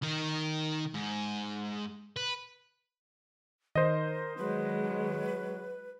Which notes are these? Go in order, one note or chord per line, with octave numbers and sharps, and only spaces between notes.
D#3 A#4
G#2
B4
D#3 A#4 C5 D#5
F#3 G#3 B4